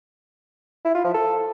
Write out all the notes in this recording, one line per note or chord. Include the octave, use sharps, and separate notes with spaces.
E4
F4
F3
A4